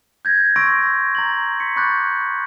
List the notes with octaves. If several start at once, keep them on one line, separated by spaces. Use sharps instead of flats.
G6 G#6 A#6
C6 C#6 E6 A#6 D7
A#5 A6 F#7
C6 B6 C#7
B5 C#6 D6 F#6 G6 A6